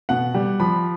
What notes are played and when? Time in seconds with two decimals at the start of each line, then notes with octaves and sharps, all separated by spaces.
0.09 B2 F#5
0.34 G3
0.60 F3 B5